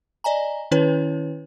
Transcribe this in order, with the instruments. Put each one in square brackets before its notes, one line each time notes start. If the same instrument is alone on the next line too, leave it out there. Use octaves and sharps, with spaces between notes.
[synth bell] D5 D#5 G#5 A#5
D#3 C#4 E4 B4 C#5